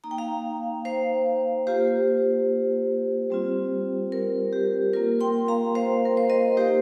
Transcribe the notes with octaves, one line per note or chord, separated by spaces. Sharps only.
A#3 D#4 A#5
G5
F5 A#5
C5 F5
A#3 F4 G4 C5
G3 C4 F4
A#4
G4
A#3 F4 A#4
G5 C6
F5 A#5
C5 F5
A#4
C5
A#4 D#5
A#3 D#4 G4 C5